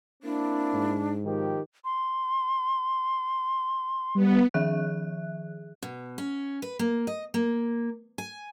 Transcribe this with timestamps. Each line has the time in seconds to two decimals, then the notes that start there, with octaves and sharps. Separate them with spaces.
0.23 A#3 C4 D4 E4
0.74 G#2
1.25 D#3 F3 G4
1.85 C6
4.15 G3 B3
4.54 D#3 F3 G#4 E5 F#6
5.82 B2
6.18 C#4
6.62 B4
6.79 A#3
7.07 D#5
7.34 A#3
8.18 G#5